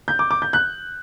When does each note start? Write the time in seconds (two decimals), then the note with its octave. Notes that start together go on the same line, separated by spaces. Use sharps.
0.08 G6
0.19 D6
0.31 D6
0.42 G6
0.53 F#6